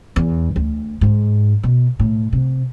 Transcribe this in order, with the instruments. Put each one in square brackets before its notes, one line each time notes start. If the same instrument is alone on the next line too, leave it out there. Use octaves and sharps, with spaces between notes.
[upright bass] E2
D2
G#2
B2
A2
C3